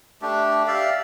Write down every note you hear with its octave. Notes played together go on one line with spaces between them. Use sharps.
A3 D4 G4
G4 D5 E5 F5